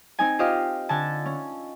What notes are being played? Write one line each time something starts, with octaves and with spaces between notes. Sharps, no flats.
C4 D#4 G#5
F4 G4 C5 D#5 F5
D3 G#5 A5
C#4